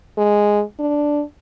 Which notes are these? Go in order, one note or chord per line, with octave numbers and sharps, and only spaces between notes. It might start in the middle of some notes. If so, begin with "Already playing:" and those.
G#3
D4